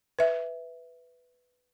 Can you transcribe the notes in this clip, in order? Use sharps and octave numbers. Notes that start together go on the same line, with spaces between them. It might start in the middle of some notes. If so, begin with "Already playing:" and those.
B4 E5